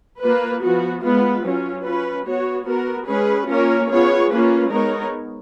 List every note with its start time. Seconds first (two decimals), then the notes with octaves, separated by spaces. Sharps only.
0.21 A#3 F4 B4
0.63 F3 B3 F#4
1.03 G#3 B3 F4 B4
1.44 F#3 C#4 F4
1.85 C#4 F4 B4
2.27 B3 F#4 C#5
2.67 B3 F#4 A#4
3.08 G#3 C#4 G#4 B4
3.49 A#3 C#4 F4 A#4 C#5
3.89 B3 F4 G#4 C#5
4.30 A#3 C#4 F4 B4
4.71 G#3 B3 D#4 A#4 C#5